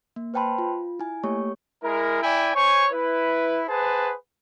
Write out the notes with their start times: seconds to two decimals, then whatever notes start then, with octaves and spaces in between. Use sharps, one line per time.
0.16 A#3
0.34 B4 C5 G5 A5 B5 C6
0.58 F4
1.00 E4 G#5
1.24 A3 A#3 G4 C#5 C#6
1.83 G#3 E4 A#4
2.22 E4 D5 G5 G#5
2.55 C5 C#5 G#5 C#6
2.93 E4 B4
3.69 G#4 B4 C5 F#5 A5